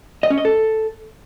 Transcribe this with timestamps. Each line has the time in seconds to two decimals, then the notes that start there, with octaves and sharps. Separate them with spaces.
0.23 D#5
0.30 C#4
0.38 D#5
0.45 A4